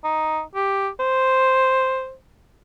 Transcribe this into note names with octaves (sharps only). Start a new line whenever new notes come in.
D#4
G4
C5